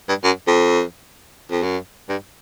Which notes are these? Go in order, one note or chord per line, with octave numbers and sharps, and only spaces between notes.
G2
F#2
F2
F2
F#2
G2